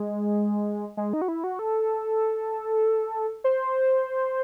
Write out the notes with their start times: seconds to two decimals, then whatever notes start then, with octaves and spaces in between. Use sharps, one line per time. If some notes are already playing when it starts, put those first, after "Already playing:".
Already playing: G#3
0.97 G#3
1.13 D#4
1.22 F#4
1.28 E4
1.44 F#4
1.59 A4
3.44 C5